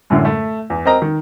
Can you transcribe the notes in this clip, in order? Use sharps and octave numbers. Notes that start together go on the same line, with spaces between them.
F#2 A2 D3
A3
E2
C4 A#4 D#5 A#5
D#3